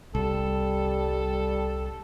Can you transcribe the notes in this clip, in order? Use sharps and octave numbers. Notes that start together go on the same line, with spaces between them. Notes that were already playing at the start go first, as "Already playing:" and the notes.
C2 G3 A4